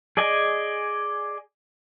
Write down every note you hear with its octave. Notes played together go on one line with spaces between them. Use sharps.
G#4 D5 D#5 G#5